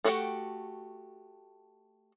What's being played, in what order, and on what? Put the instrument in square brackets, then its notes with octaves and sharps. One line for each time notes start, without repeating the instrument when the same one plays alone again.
[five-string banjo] A3 F#4 G4 F#5 G5